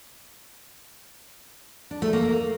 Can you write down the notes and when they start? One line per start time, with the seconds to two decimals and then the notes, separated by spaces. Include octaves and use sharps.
1.91 D4
2.02 A3
2.13 A#3